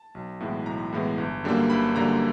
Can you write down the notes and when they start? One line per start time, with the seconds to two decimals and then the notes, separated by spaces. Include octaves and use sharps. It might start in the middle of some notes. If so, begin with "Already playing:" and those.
Already playing: A5
0.15 B1
0.40 A2 E3 G#3 B3
0.66 B1 A#5
0.93 A2 E3 G#3 B3
1.18 G1
1.44 F#2 D3 G3 A#3
1.70 G1 B5
1.96 F#2 D3 G3 A#3 A#5